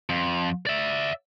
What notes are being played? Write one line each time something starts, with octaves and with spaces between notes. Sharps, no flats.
F2
D5 E5